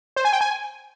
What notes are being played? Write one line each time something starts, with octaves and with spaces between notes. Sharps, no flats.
C5
G#5
G5
G#5